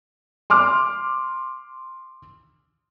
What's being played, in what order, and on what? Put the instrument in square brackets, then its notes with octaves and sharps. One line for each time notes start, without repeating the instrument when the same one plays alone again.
[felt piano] C6 D6 F6